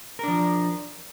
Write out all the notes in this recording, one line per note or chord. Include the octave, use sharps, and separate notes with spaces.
F3 D4 A#4